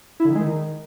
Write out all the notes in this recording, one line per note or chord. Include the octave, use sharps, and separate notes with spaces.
E4
D3
D#3
G#3
D#3